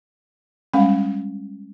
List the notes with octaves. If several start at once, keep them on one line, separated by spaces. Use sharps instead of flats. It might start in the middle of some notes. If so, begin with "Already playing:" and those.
G3 G#3 C#4 F5